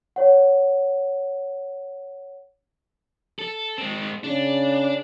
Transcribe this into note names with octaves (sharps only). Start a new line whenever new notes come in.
C#5 F#5
A4
G#3 C4
C#3 D4